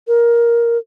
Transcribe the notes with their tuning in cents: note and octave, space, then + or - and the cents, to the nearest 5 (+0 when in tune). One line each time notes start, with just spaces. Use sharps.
A#4 +10